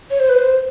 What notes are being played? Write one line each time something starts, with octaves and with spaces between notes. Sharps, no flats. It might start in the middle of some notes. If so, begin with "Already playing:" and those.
C#5
C5
B4
C5